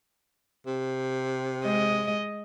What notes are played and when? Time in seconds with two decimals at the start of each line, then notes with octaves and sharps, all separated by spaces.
0.66 C3
1.64 G#3 D#5